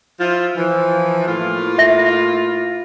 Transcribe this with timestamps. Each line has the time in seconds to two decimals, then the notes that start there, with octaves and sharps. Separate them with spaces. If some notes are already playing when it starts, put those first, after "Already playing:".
0.20 F3 E4 F4
0.56 E3 F3
1.28 A2 A#3 F4
1.78 E5 A#6